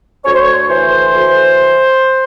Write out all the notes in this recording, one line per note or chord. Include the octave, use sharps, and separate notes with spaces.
D2 C#5
C5
C#5
E3 C5
D2